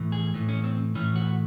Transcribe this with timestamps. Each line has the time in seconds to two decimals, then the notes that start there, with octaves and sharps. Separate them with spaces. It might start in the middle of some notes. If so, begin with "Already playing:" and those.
Already playing: A2 E3
0.12 G#4
0.34 A2 E3
0.49 C#4
0.64 C4
0.95 A2 E3 C#4
1.16 F#4